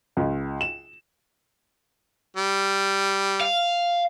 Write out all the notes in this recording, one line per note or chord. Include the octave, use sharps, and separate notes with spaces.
C#2
E7
G3
F5